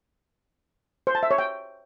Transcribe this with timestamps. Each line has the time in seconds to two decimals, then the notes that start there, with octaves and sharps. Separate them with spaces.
1.07 C5
1.15 A5
1.23 E5
1.31 C#5
1.38 G5